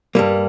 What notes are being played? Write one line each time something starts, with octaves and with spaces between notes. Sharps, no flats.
G2 G3 A#3